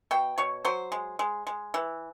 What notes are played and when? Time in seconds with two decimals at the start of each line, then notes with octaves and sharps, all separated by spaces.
0.11 B2 G5
0.38 B2 C#5
0.65 F#3 C5
0.92 G#3
1.19 G#3
1.47 G#3
1.74 E3